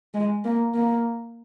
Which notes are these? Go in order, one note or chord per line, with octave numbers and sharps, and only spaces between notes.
G#3
A#3
A#3